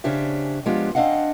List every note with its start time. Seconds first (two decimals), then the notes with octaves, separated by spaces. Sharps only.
0.04 C#3 C#4 D4 G4 C5 E5
0.66 F3 G#3 B3 D4 F4 G4
0.95 C4 D4 D#5 F5 F#5